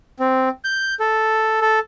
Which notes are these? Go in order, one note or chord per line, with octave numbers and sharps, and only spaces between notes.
C4
G6
A4
A4